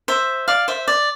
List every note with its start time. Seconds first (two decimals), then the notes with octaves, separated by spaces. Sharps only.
0.08 C5 E5
0.48 D5 F5
0.68 C5 E5
0.88 D5